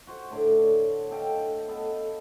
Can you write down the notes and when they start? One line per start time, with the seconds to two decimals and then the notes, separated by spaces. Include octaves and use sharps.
0.07 F#4 C5
0.30 A2 D3 C#5
1.11 A4 D#5 F5 G5
1.68 B3 A4 D#5